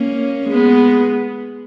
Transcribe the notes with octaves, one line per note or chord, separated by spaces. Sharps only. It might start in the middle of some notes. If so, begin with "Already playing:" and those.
Already playing: A#3 C#4
G#3 B3